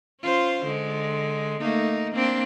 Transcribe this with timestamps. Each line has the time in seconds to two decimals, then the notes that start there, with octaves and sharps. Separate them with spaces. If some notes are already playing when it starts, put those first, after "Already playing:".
0.21 C#4 F4 C5
0.65 D3 G#3
1.60 A3 A#3 D#4
2.13 A#3 C4 D4